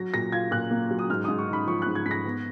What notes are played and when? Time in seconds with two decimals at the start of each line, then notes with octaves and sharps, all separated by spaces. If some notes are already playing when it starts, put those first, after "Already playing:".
Already playing: F#3 A#6
0.14 A#2 A#6
0.32 F4 G#6
0.51 A#2 F#6
0.71 A#3
0.90 F#3
0.99 D#6
1.09 G#2 F6
1.24 G#2 D#6
1.38 C#6
1.48 D#4
1.53 B5
1.67 F3 C#6
1.82 G#2 F#6
1.95 G#6
2.06 G#2 B6
2.11 A#6
2.25 B3